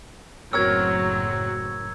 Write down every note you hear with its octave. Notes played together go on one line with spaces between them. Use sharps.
F#1 A2 F#3 C4 A#4 C#5 E6 G#6